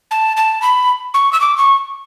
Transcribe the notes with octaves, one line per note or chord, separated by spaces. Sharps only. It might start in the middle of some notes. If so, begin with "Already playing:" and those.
A5
A5
B5
C#6
E6
D6
C#6